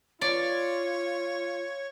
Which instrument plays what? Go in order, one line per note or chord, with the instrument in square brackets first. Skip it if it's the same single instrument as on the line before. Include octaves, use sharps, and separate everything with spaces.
[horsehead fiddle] F4 [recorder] C#5 [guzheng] D5